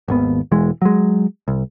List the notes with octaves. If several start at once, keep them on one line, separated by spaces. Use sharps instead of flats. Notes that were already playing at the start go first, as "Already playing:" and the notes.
G#1 D#2 B3
E1 E3 G#3
F#3 G#3
C2